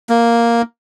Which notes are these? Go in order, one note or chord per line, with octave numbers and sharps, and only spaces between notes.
A#3